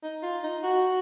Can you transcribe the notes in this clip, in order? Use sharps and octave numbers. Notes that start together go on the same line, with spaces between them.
D#4
F4
D#4
F#4